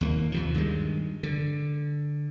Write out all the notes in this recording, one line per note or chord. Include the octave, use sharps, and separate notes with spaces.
D#2 A3 A#3
D#2 C3 F3
G2 D#3 E3 G#3
D3